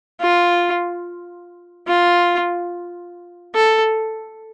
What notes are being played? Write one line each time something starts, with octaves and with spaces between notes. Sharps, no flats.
F4
F4
A4